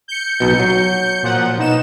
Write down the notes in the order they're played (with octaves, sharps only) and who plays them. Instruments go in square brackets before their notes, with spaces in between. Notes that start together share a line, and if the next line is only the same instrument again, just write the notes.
[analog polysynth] G6 C#7
[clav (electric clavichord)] B1 B2
F#3
[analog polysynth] A#2 F3 F#5
B2 D#4 E7